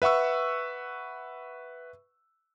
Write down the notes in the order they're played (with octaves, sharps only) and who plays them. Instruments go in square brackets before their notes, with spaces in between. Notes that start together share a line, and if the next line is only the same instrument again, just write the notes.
[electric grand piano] B4 E5 F#5 C#6 E6